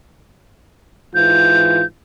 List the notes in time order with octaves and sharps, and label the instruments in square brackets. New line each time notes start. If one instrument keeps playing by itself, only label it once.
[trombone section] G#2 E3 F4 [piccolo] G6